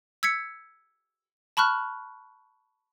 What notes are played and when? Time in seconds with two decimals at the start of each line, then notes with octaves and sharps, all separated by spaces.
0.23 E6 G#6 B6 C#7
1.57 A5 B5 C#6 F6 F#6